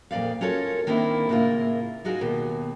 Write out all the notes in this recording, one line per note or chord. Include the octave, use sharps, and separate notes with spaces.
F2 A#2 C#3 D5 F5
C#4 F4 F#4 A4 A#4 C#5
D#3 A#3 C4 D4 E4
A2 C#3 A#3 E4 F4 A#4
D#4 F4 F#4 G#4 A#4
D#2 B2